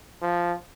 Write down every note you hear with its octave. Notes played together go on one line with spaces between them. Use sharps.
F3